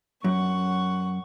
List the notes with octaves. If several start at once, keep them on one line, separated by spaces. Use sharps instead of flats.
F#2 F#5 C#6